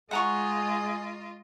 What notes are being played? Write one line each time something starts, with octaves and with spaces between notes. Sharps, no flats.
G#3 F4 G#4 D#5 F#5 A#5 C#6